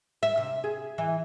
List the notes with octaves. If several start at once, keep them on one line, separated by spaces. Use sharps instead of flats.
E5
C3
G#4
E3